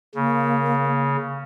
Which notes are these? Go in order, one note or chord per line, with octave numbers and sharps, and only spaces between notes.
C#3 A#3